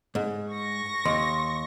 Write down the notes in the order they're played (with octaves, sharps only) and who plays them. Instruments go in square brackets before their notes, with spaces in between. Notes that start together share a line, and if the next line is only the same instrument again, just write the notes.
[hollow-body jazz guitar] G#2
[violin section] C#6 A#6
[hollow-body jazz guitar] D#2 [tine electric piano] C6